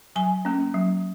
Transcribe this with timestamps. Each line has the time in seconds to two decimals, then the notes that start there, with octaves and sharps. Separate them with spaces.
0.16 F#3 G#5
0.45 A#3 C#4
0.74 F#3